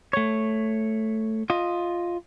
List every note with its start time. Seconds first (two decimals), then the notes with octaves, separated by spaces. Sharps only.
0.13 A3 C#5
1.50 F4 D#5